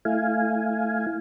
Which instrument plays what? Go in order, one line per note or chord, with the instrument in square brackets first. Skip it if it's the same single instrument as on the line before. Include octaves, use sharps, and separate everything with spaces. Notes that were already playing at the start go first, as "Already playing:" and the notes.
[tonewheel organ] A3 E4 F5 G#5